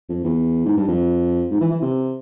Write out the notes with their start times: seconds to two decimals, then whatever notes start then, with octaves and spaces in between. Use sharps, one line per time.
0.09 F2
0.24 E2
0.65 G#2
0.77 G2
0.88 F2
1.50 G#2
1.60 E3
1.72 E3
1.82 C3